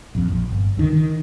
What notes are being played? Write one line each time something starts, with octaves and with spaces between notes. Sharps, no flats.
A#1 F2
A#1
G1
C#2 D3 D#3
D#3